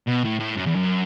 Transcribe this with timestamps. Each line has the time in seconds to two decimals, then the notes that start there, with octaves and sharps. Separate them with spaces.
0.07 B2
0.24 A2
0.40 A2
0.57 F#2
0.67 E2
0.76 F#2